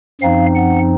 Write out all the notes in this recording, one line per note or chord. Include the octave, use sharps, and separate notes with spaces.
F#2 F3 C4 D#4 F5
F#5